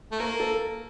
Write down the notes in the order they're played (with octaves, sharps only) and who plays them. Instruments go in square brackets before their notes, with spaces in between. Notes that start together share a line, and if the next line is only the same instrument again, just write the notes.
[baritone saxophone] A3
[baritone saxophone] A#3 [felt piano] A#4
[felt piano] A4